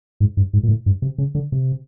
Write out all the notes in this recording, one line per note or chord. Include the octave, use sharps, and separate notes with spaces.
G#2
G2
G#2
A#2
A2
G2
C3
C#3
D3
C3